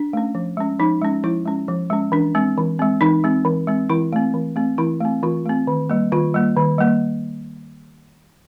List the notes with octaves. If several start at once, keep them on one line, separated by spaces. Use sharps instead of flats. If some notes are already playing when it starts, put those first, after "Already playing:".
Already playing: D4
A3 C#4
F3
G#3 C#4
F3 D#4
G#3 C#4
F3 E4
G#3 C#4
F3
G#3 C#4
E3 D4
G#3 C4
E3
G#3 C4
E3 D#4
G#3 C4
E3
G#3 C4
E3 E4
A3 C4
E3
A3 C4
E3 E4
A3 C4
E3 F4
A3 C4
D#3
G3 A#3
D#3 F4
G3 A#3
D#3
G3 A#3